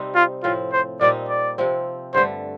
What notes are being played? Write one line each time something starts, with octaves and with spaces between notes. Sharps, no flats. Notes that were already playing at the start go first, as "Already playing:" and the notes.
Already playing: C3 G3 C4 D#4
F4
A2 F3 C4 F4
C5
A#2 G3 C4 D#4 D5
D5
C3 F3 C4
G2 D3 A3 C5